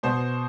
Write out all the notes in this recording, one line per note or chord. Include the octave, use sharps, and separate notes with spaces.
B2 C5